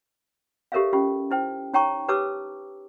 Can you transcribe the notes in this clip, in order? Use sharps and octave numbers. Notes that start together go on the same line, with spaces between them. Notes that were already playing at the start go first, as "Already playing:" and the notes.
G4 A4 A#4 C#5 E5 F5
C#4 F4 G4
E4 C5 G5
D#4 C#5 G5 A5 A#5 C#6
G4 B4 C#5 A5 D6 E6